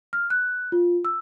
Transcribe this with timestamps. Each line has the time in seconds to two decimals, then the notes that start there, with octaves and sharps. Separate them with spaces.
0.13 F6
0.30 F#6
0.72 F4
1.05 E6